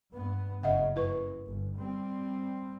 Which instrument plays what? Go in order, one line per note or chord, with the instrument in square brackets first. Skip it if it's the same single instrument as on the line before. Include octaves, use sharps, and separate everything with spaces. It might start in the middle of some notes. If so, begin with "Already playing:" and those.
[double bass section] G2 B3
[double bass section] F#1 C#3 [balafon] D#5 E5 F#5
[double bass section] F#2 [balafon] E4 B4 C#6
[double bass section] G1
G3 C4